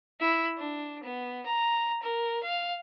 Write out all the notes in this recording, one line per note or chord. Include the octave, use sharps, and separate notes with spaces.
E4
D4
B3
A#5
A#4
F5